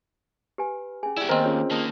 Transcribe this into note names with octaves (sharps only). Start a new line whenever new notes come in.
G4 B4 G#5
C#4 G#4 G#5
E4 G4 D5
D#2 B3 C4 A#4 C5 D#5 G#5
C#4 F4 G#4 C#5
D#3 A#3 A5 D#6